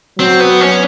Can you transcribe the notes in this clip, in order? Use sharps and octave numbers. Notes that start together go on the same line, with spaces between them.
F#3 C4
B3
C#4